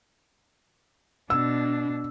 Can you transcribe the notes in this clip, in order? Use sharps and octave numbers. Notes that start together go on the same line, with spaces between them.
B2 D4 E6